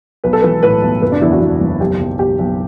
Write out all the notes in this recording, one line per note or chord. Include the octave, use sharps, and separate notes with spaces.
B1 B4
A4
E3 B4
A2 B4
B1
F#1 B4
D4
E2 E4
F#4
E2
F#1
B1 G4
B1
B1 G4
B1